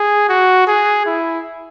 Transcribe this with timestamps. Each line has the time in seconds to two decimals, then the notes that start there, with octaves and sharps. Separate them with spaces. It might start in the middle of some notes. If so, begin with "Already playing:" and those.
Already playing: G#4
0.29 F#4
0.67 G#4
1.06 E4